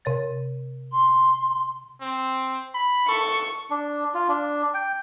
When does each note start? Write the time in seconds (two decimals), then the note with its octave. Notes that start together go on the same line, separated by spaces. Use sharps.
0.05 C3 C#5 A6
0.91 C6
2.01 C4
2.75 B5
3.09 A4 C#6
3.70 D4
4.15 F4
4.29 D4
4.74 G5